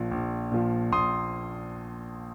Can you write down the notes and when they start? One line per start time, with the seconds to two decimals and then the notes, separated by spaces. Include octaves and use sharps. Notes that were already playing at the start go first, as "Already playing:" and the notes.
Already playing: A#1 A#2 F3
0.11 A#1
0.52 A#2 F3
0.92 A#1 C6 D#6